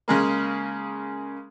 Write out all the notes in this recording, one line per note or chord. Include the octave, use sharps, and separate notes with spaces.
C#3 G#3 A#3